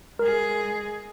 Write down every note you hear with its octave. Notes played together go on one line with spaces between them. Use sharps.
G#3 G#4 A#4